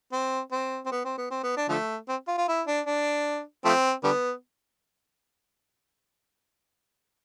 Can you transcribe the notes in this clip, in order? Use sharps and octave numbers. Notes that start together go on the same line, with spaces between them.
C4
C4
C4
B3
C4
B3
C4
B3
D4
D3 F3 A3
C4
F4
F4
E4
D4
D4
F3 A3 C4
D3 G3 B3